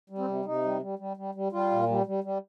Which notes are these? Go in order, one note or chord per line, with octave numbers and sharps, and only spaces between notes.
G3
C4
C3
C3 D#4
G3
G3
G3
G3
G3
G3 F4
A#2
G3
G3
G3